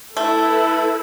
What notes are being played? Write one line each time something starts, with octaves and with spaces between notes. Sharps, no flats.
A3 E4 A4 B4